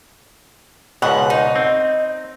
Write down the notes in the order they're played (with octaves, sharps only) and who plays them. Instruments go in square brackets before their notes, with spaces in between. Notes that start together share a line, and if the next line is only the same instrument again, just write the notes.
[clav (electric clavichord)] C#2 G#2 B2 [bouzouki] F#5
[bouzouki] D#4
[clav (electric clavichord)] C4